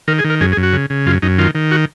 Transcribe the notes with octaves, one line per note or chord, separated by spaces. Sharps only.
D#3 A#4
G#4
D#3
A#4
F#2 G#4
G#4
F#2
F#4
C#3
C#3
F#2 F4
F#2 D#4
D#3 F4
D#3
F#4